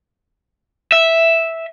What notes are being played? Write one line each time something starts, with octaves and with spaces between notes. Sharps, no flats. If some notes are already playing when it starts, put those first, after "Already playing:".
E5